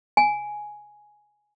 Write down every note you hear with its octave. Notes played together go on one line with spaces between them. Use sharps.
G#5